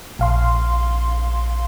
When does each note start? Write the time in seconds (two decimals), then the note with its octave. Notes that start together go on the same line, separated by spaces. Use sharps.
0.19 A#1 F5 C6